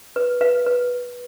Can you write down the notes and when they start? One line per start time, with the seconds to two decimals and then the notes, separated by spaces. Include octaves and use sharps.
0.16 B4
0.41 B4 F5
0.66 B4